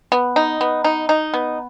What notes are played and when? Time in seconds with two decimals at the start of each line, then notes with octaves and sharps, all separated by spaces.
0.12 B3
0.36 D#4
0.61 B3
0.84 D#4
1.09 D#4
1.34 B3